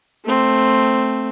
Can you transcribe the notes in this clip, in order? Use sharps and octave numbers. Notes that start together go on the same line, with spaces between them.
A3 C4